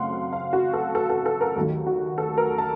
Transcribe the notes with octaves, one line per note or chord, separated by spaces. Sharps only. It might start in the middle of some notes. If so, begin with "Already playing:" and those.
Already playing: F#2 C#3 F#3 A3 C4 F5 F#5 C6
F5
F#4
A4
A4
A4
A4
A#4
D#2 D#3 F#3 A3
F#4
A4
A#4
A5